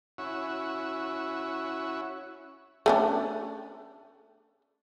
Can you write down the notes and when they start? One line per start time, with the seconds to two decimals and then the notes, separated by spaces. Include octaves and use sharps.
0.18 C#4 E4 F#4
2.86 A3 C#4 D4